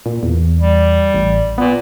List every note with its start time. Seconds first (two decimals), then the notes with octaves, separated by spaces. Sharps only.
0.06 A#2
0.23 E2
0.60 G3
1.14 A1
1.58 A#2 B3